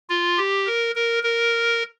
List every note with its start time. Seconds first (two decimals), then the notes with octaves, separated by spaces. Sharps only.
0.09 F4
0.38 G4
0.67 A#4
0.95 A#4
1.23 A#4